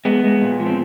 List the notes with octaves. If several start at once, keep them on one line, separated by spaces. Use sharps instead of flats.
G#3 B3
G#3
A#2
F3
C4